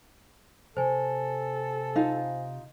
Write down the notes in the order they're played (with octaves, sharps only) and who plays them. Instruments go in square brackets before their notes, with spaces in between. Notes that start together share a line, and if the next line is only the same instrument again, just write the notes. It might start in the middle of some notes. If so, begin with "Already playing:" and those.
[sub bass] C3 [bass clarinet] A4 [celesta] C5 G#5
[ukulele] D#4 F4 F5